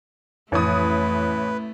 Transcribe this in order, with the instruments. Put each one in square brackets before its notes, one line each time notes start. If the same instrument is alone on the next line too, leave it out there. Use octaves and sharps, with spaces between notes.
[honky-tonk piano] A1 D#6 [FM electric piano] F2 E3 F#6 [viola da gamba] A3 [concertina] B4